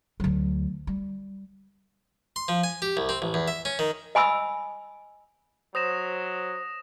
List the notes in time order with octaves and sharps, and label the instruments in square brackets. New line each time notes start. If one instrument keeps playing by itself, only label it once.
[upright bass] D2 F#3
G3
[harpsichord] C6
F3
G#5
G4
C2
C4
A1
E2
E5
C#4
D#3
[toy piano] D#5 G#5 B5 D#6 E6
[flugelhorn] F#3 [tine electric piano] C5 [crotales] D#6 A#6 E7